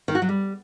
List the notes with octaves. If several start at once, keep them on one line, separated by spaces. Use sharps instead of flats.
D#3
F#4
F#3
G3